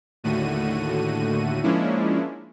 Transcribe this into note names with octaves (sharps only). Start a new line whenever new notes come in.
D#2 A2 D3 A3 F#4 D#7
F3 G#3 A#3 C#4 D4 E4